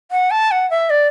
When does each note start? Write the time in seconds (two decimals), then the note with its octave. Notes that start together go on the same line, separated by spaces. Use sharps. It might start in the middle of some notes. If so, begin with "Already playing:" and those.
0.11 F#5
0.31 A5
0.51 F#5
0.70 E5
0.90 D5